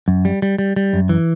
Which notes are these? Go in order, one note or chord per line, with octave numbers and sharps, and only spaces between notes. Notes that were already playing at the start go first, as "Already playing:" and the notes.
F#2
G3
G3
G3
G3
F#2
E3